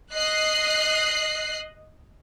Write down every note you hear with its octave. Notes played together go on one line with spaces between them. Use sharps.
D#5 F#6 C7